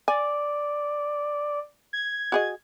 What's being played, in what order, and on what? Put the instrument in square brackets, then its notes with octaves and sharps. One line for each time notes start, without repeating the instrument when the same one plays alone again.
[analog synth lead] D5 [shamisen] G#5
[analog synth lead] G#6
[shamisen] F#4 G#4 D#5